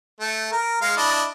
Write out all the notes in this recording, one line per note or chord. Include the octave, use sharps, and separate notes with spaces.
A3
A#4
G#3 F5
D4 E4 D#5